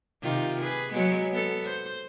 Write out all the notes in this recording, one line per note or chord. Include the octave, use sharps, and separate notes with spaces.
C3 D#3 F4
G#4 B4
F#3 G#3 B3
B3 A4
C5